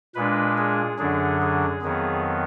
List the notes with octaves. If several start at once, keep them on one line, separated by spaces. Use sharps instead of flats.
A#2 G#3 D4 B4
G#4
F#2 D3 F#3 D4 G#4
G#4
F2 D#3 F#3 B3 G#4